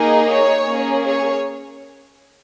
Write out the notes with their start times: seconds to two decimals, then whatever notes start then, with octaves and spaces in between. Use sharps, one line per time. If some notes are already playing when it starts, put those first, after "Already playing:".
Already playing: A#3 D#4 G#4
0.26 C#5
0.65 A#3 C#4 G#4
1.06 C#5